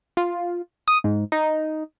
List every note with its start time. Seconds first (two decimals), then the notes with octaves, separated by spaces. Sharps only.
0.17 F4
0.88 D#6
1.04 G#2
1.32 D#4